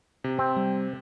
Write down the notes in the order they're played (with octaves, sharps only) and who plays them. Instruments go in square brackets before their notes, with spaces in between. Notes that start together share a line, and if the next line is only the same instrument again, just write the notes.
[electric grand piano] C3
[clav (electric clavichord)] C4
[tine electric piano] G3